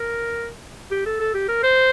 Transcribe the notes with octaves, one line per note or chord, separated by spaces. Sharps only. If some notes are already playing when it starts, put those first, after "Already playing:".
Already playing: A#4
G4
A4
A4
G4
A#4
C5